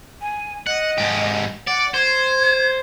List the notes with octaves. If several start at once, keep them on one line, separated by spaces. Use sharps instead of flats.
G#5
D#5 F#5
G#2 G4
D5 F#5
C5 G#6